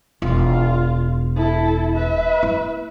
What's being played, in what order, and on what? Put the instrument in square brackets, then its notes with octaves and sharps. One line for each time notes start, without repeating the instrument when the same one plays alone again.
[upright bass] E1 [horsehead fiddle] F4
[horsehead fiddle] E4 A4
B4 E5
[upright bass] A#3 E4